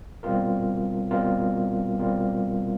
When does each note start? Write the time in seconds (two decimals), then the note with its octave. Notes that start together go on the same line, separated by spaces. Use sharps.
0.23 B2 G3 C4 F4 A#4
1.11 B2 G3 C4 F4 A#4
1.99 B2 G3 C4 F4 A#4